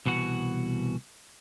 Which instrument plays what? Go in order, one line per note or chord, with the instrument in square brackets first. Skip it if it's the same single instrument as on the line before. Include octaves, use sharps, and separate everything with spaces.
[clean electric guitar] C2 B2 E3 F#4 F#5